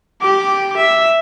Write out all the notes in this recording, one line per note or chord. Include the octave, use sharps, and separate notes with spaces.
G4 D6
E5